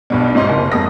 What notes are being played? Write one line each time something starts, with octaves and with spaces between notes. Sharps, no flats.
B1 G2 B2
G#2 C3 D#4 C6
F#1
F2 G#3 D#6 A#6